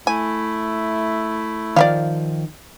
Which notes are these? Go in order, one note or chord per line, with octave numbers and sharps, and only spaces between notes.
A3 E4 G#5
D#3 F3 D5 E5 F5